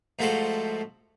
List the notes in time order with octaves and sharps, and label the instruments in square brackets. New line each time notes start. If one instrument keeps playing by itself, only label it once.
[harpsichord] G#2 F3 A3 F#4 A4 C5